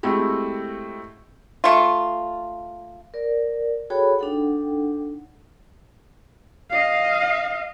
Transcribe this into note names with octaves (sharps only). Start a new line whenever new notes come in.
G#3 A3 C4 E4 F#4 G4
A3 F4
A#4 D5
F#4 G#4 A4 C#5 G5 B5
D4 D#4 A4 F#5 G5
D#5 F5